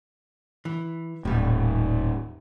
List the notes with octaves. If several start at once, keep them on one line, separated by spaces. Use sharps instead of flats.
E3
D#1 A2 G3